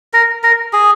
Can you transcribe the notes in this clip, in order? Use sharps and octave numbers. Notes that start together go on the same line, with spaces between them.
A#4
A#4
G#4